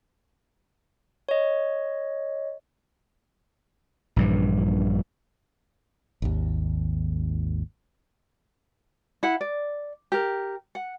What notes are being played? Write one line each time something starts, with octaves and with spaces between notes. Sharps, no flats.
C#5 D#5
A#1 G2 E3
G#1 D#2
E4 F#5
D5
G4 A#4
F#5